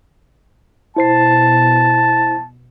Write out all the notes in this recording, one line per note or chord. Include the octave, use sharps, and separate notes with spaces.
B2 E4 C5 A5 C7